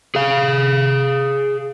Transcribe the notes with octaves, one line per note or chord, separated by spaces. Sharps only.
G#4 F5